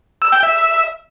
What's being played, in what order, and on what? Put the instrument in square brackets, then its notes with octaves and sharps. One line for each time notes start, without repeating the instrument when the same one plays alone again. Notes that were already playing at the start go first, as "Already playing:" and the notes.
[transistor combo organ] E6
G5
E5